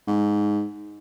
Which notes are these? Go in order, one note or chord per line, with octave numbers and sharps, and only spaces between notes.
G#2